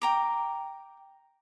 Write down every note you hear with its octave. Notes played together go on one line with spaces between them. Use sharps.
G5 A#5 D6